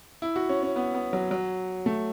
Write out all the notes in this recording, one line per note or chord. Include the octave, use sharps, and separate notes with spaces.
E4
F#4
C#4
C#4
B3
B3
F#3
F#3
A3